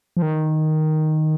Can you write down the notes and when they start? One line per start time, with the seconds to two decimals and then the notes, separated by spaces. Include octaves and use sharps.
0.17 F3
0.22 D#3